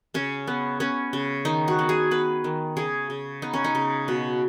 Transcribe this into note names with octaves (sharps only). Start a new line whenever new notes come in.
C#3 C#4
B3
B3 C#4
C#3
D#3 D#4
F#4
B3
G#4
B3 B4
D#3
C#3 G#4
C#3
B3 D#4
C#4
D#4
C#3
B2